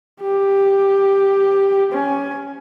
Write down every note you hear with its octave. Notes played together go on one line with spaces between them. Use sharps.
G4
C#4 G#5